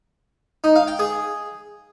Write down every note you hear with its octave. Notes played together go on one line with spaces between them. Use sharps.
D#4
F5
G5
G#4